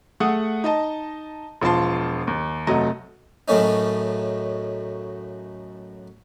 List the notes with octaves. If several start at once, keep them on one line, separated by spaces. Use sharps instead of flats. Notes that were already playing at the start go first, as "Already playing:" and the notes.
A3 G#4 F#5 D#6
D#4 D#5 A5
E1 F3 F4 A5 C6
D#2
F1 F#3 A3 D#5 A#5
F#2 A2 F#3 A3 C#4 D#4